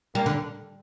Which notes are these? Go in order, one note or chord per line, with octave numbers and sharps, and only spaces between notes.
G3 A#3
D3